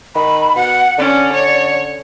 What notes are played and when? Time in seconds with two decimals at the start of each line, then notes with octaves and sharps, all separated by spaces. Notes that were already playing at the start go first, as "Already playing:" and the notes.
0.15 D#3 B5
0.56 B2 F#5
0.98 D3 C#4 D5
1.33 C#5